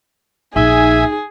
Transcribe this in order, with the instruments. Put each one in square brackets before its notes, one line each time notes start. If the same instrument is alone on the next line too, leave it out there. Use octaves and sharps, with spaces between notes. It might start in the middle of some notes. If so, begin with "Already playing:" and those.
[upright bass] A#1 [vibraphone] D#4 [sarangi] G#4 [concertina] E5 G#5